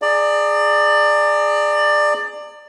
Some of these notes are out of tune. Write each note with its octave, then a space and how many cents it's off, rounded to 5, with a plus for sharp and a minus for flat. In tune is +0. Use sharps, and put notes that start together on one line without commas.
G#4 +0 D5 +20 A#5 -35